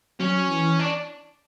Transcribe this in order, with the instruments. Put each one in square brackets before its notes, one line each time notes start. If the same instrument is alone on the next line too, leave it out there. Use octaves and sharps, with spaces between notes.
[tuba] F#3 [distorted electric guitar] C#4
[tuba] E3
[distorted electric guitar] D4